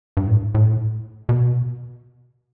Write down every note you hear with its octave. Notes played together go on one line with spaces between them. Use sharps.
G2
A2
G2
A2
B2